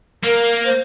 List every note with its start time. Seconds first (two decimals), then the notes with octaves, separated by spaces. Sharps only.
0.24 A#3 A#4
0.65 C5